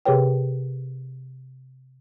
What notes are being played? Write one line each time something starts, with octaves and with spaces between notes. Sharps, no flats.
C3 G4 G#4 B4 C#5 G5